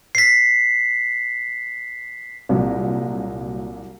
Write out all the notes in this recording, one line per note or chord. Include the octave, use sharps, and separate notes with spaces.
B6 C7
C2 A#2 F#3